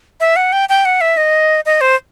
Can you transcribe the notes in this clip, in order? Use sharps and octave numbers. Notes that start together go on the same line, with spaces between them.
E5
F#5
G5
G5
F#5
E5
D#5
D#5
C5